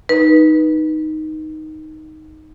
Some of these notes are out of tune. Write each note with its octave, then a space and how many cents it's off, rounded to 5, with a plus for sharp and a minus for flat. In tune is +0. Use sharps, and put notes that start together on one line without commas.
D#4 +0 B4 -20